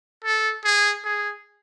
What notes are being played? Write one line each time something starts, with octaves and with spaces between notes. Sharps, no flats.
A4
G#4
G#4